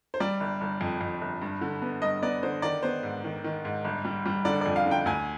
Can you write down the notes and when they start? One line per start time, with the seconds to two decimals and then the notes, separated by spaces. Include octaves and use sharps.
0.14 C5
0.20 G3 D5
0.40 G1
0.61 G1
0.81 F2
1.01 F2
1.21 G1
1.42 G2
1.61 D3
1.82 B3
2.02 G2 D#5
2.22 B3 D5
2.43 D3 C5
2.62 D#3 D5
2.83 B3 C5
3.03 G#2
3.24 D#3
3.44 D#3
3.65 G#2
3.85 G1
4.05 G3
4.25 G3
4.45 D3 D5
4.61 F2 D5
4.76 F5
4.86 D3 G5
5.06 D2 G#5